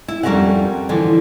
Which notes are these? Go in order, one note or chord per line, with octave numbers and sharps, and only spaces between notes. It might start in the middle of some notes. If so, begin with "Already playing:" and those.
E4
F2 G3 C#4 A#4 E5 F#5
D3 E3 F3